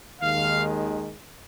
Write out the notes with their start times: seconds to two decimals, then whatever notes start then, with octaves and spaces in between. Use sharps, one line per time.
0.22 D#2 D#3 G#3 F5